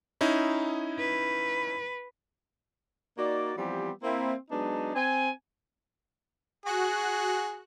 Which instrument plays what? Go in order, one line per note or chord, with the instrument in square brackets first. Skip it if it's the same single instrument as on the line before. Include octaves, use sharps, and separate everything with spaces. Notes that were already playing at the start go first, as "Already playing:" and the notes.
[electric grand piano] C#4 D#4 E4
[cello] B4
[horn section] A#3 D#4 F#4 D5
E3 F3 G3 B3 C4 G4
A#3 C4 E4
F#3 G#3 B3 D4 D#4 A5
C4 G#5
[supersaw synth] F#4 F#6 [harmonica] G#4